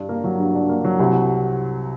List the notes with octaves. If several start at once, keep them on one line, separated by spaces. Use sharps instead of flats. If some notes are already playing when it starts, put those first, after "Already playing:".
Already playing: G2 D4
A#3
F#3
G2
D4
A#3
F#3
C2